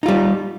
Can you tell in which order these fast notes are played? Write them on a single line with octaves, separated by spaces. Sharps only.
D#4 F4 G3